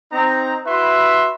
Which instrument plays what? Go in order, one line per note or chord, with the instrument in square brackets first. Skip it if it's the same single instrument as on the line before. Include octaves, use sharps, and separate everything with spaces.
[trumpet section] C4 D#4 A#5
E4 F#4 B4 E5 B5 C6